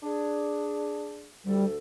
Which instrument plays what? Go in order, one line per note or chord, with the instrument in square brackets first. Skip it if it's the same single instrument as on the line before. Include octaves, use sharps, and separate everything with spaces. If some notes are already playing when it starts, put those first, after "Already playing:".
[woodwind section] D4 G#4
[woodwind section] D2 A4 [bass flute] G3